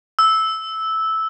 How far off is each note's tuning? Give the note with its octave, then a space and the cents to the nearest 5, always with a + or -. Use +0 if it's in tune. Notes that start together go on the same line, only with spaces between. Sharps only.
E6 -10